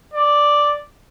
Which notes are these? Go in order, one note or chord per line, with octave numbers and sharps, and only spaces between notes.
D5